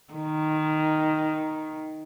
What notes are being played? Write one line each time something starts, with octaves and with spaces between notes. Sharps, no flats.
D#3